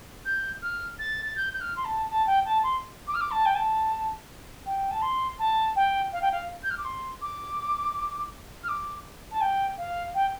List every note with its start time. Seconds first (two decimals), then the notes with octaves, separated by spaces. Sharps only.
0.25 G6
0.62 F6
0.99 A6
1.25 A6
1.36 G6
1.53 G6
1.61 F6
1.77 C6
1.85 A5
2.10 A5
2.27 G5
2.46 A5
2.63 C6
3.07 D6
3.14 F6
3.21 D6
3.31 A5
3.46 G5
3.55 A5
4.66 G5
4.91 A5
5.02 C6
5.39 A5
5.76 G5
6.13 F5
6.22 G5
6.32 F5
6.63 G6
6.71 F6
6.78 D6
6.85 C6
7.21 D6
8.64 F6
8.69 D6
9.31 A5
9.41 G5
9.78 F5
10.15 G5